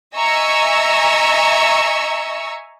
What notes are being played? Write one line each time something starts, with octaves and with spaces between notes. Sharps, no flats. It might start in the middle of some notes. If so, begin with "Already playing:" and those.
D#5 E5 G#5 A#5 C#6 E6